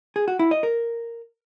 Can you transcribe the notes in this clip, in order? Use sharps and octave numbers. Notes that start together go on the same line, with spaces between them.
G#4
F#4
E4
D#5
A#4